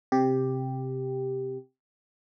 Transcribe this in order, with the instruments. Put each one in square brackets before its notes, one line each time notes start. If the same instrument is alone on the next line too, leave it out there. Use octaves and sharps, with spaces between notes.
[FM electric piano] C3 G4